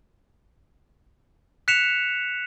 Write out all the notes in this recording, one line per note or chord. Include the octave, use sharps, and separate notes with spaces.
F#6 B6 C#7 E7 F7